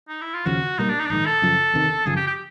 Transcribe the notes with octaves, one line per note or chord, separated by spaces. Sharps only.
D#4
E4
F4
D#2 C#3 F3 F#4
B1 B2 G3 A#3 D#4
D4
D#4
D4
A#1 G#2 D#3 D#4
A4
F#2 C#3 F3
E2 C3 D#3
G1 F#2 C#3 F3 G#4
G4
G4